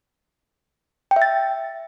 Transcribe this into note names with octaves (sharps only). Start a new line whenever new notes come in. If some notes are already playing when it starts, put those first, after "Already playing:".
G5
E5
A6